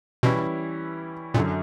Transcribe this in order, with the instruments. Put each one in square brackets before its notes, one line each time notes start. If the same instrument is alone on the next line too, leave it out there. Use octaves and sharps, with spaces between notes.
[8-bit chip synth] B2 [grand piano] E3 G3 C#4 E4
[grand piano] F#2 D3 F#3 [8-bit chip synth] A#2